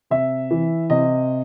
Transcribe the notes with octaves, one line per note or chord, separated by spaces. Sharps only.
C3 E5
E3
C3 D#5